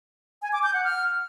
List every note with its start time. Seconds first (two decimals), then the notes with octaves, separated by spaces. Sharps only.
0.42 G#5
0.53 D6
0.63 G6
0.74 F#5
0.84 F6